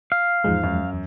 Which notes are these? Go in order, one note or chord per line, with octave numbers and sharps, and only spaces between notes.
F5
E2 G#2 F3 G#3
F#2
E2